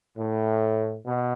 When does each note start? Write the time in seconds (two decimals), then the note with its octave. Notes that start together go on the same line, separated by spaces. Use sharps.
0.17 A2
1.05 B2